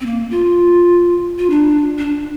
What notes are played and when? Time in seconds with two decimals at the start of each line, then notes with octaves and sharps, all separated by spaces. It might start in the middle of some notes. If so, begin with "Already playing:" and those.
0.01 C4
0.06 A#3
0.31 F4
1.39 F4
1.50 D4
1.98 D4